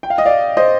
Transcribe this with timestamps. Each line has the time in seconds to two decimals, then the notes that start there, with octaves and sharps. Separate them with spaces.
0.03 G5
0.10 F5
0.18 D#5
0.25 D5 F5
0.57 C5 D#5